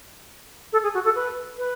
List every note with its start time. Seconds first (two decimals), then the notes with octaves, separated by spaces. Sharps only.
0.73 A4
0.83 G#4
0.94 F#4
1.05 A4
1.16 B4
1.58 B4